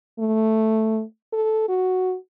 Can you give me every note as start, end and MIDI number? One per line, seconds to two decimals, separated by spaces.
0.19 1.02 57
1.33 1.65 69
1.68 2.16 66